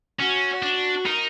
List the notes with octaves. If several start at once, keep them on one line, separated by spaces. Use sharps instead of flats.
C#4 F#4
D4
D#4 A#4